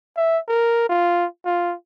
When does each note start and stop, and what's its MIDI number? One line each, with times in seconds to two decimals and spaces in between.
0.17 0.39 76
0.49 0.86 70
0.89 1.26 65
1.45 1.75 65